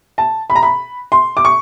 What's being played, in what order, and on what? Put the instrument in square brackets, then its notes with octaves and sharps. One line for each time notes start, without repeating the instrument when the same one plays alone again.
[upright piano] A5
B5
A#5
B5
C6
D6
C#6